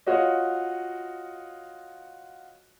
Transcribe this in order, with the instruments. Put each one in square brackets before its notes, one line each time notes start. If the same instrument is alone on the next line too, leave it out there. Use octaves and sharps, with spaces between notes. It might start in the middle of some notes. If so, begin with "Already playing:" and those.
[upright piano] F4 F#4 C#5 D#5